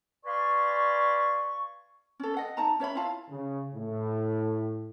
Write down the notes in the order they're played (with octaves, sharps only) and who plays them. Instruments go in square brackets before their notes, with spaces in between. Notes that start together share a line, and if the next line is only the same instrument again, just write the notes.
[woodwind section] B4 D5 F5 G#5 C6 C#6
[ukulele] C#4 A4
D#5 F#5
D#4 A5 A#5
C#4 C#5 E5 B5
E4 F4 F5 A5
[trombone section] C#3
A2